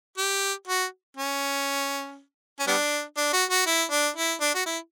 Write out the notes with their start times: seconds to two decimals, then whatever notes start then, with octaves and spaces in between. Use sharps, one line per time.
0.17 G4
0.67 F#4
1.17 C#4
2.60 C#4
2.67 G3 B3 D4
3.17 D4
3.33 F#4
3.50 F#4
3.66 E4
3.91 D4
4.16 E4
4.41 D4
4.55 F#4
4.66 E4